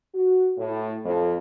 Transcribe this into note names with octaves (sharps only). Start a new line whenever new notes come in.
F#4
A2
F2